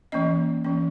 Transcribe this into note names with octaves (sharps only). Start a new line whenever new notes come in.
E3 A#3 C#4 D#5
E3 A#3 C#4